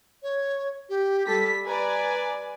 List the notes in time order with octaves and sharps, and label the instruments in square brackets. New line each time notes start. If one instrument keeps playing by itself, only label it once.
[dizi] C#5
G4
[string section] G3 B6 [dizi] A4
[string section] B4 D5 G#5 [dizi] A#5